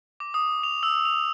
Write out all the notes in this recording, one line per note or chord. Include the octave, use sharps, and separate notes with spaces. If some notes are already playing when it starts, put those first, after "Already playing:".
D6
D#6
F7
E6
F7